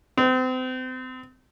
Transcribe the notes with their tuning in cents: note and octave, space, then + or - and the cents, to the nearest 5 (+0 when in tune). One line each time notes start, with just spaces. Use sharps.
C4 -35